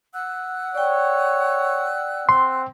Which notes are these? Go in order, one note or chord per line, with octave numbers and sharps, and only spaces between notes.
F#5 E6 F#6
C#5 D5 G5
C4 C6